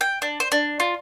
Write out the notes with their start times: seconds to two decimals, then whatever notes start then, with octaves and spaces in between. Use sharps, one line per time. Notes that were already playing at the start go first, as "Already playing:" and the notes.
0.01 G5
0.22 D4
0.40 C5
0.52 D4
0.80 F4